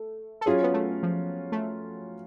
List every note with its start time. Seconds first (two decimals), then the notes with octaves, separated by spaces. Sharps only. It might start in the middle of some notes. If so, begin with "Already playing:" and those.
Already playing: A3
0.41 A4
0.46 F#3 C#4 F4 G#4
0.63 B3
0.74 A3
1.03 F3
1.52 A3